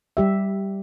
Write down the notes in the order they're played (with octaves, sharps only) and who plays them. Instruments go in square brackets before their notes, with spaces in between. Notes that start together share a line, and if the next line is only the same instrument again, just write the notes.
[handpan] G3 G4 E5